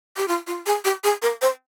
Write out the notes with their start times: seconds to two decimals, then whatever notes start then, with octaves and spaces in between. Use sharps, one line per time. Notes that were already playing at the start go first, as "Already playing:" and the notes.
0.17 G4
0.28 F4
0.47 F4
0.66 G#4
0.85 G4
1.04 G#4
1.22 A#4
1.42 C5